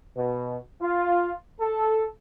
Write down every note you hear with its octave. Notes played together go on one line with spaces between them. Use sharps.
B2
F4
A4